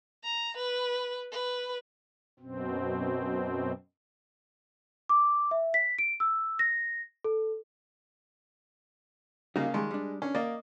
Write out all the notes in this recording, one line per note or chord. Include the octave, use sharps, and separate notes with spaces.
A#5
B4
B4
F#2 B2 C4
D6
E5
B6
D7
E6
A#6
A4
C#3 G3 A#3 D#4 F#4
D#3 G3 G#3
G3 D4
C#4 D4
A#3 D5 D#5